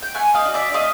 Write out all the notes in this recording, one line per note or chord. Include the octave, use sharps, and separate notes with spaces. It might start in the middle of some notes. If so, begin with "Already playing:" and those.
G5
A3 F#5 G#5
D#5 F5
D4 F#4
D5 E5
A3 D#5 F5